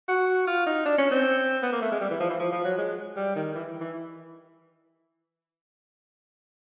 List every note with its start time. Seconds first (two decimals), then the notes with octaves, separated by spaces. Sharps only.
0.08 F#4
0.47 F4
0.67 D#4
0.85 D4
0.98 C#4
1.11 C4
1.63 B3
1.72 A#3
1.82 A3
1.92 G#3
2.01 G3
2.10 E3
2.20 F3
2.30 E3
2.39 F3
2.52 F3
2.65 F#3
2.78 G#3
3.16 G3
3.36 D#3
3.55 E3
3.80 E3